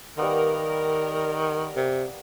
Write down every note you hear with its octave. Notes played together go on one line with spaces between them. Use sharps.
D#3 G3 A#3 B3 A#4
C3